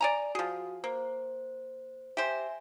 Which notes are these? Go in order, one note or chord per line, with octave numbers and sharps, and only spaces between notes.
D5 G#5 A#5
F3 F#4 G#4
A#3 C5
G4 C5 E5 G#5